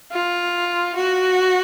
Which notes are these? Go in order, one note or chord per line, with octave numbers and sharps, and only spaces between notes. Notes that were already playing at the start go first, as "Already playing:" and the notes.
F4
F#4